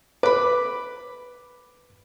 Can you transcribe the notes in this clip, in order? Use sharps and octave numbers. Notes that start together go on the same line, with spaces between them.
B4 B5 D6